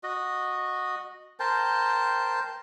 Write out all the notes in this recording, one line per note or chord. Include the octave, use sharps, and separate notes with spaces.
F#4 D#5
A#4 C5 G5 A5